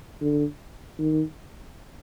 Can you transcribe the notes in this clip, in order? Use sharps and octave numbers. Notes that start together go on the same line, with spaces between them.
D3
D#3